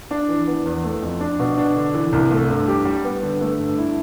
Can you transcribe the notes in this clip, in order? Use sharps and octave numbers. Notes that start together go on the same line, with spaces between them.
D4
E3
B3
E2
A3
F2
D4
B2
D4
D3
E3
C2
A3
G2
G4
G3
B3
D3
A3
G2
E4